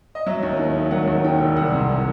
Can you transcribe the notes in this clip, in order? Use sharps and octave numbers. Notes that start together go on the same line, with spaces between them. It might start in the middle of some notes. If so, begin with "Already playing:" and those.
D#5
F#3 E5
D#2
D#3
E1
F#3 F#5
D#2
D#3 G5
E1
C2 F#5
C3
E3